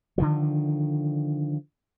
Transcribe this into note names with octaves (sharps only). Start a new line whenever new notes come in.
D3 D#3 F3